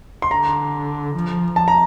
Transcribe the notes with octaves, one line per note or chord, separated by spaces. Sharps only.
C6
D3 A#5
F3
A5
A#5